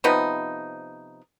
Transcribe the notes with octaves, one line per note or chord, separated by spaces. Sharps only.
C3 F3 B3 D#4